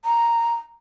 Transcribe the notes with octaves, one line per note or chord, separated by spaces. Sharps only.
A#5